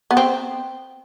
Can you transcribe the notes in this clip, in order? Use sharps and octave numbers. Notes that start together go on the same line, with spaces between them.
B3
C4